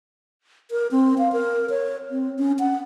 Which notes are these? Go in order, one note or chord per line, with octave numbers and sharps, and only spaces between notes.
A#4
C4
F5
A#4
C#5
C4
C#4
F#5